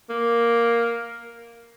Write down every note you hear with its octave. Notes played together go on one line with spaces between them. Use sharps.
A#3